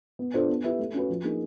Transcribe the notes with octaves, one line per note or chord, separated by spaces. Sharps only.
B3
D4 F4 A4 C5
B3
E4 G4 B4 E5
A3
C#4 F#4 B4
F3
A#3 D#4 G#4